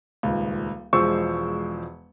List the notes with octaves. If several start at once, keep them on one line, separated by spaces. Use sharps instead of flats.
D#1 C#2
E1 F3 G#3 C5 C#6 E6